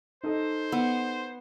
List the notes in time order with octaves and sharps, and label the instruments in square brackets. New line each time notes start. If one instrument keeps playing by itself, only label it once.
[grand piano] D#4 A4 D#5 [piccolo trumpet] C5
[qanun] B3